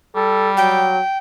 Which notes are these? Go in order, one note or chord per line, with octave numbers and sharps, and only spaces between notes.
G3 A4
F#3 G5